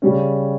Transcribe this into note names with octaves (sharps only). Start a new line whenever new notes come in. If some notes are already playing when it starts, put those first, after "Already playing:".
C#3 G3 C#4